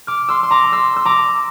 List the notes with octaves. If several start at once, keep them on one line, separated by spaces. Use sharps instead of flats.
D6 F6
C6 E6
C6
A#5 D6
C6 E6
E6
A#5 D6